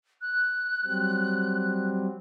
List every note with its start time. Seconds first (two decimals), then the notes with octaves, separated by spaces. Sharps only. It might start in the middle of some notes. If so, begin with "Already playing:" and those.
0.21 F#6
0.85 F#3 G3 C4